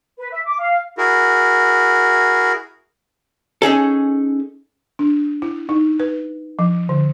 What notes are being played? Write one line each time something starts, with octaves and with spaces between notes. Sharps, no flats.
B4
E5
D6
F5
E4 F#4 G#4 A#4
C#4 D#4 G#4 A4
D4
E4
D#4
B4
F3
D3